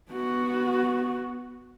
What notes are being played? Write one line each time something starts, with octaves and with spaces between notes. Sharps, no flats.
B3 F#4